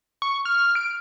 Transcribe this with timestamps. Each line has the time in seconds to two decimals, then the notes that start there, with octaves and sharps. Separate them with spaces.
0.22 C#6
0.45 F6
0.75 D7